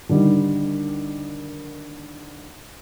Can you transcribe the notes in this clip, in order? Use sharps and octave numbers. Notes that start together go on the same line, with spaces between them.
D3 D#3 G3